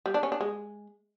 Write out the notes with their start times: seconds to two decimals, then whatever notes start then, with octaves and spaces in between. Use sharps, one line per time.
0.06 G3
0.14 D4
0.23 C#4
0.32 D4
0.41 G#3